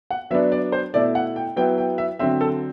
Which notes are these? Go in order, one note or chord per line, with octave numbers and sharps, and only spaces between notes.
F#5
F#3 B3 D4 E5
D5
C5
B2 A3 E4 D5
F#5
G5
F#3 B3 E4 G5
G5
E5
D3 F#3 C4 E5
A4